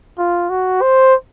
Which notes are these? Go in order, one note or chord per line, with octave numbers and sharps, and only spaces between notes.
F4
F#4
C5